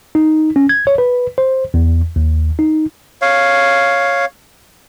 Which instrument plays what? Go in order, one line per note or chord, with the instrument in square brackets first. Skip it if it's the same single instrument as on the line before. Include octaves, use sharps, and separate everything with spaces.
[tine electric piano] D#4
C#4
G#6
C#5
B4
C5
E2
D#2
D#4
[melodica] C#5 F5